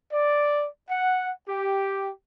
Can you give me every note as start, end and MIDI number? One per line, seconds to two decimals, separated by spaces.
0.12 0.67 74
0.90 1.32 78
1.49 2.11 67